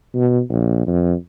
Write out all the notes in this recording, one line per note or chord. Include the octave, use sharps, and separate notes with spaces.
B2
A#1
F2